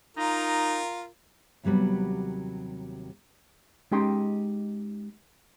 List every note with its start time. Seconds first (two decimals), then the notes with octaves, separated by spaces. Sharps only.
0.17 D#4 F4 A#4
1.63 D#2 C3 F#3 G3 B3
3.92 G#3 C#4 D#4 G4 G5 C6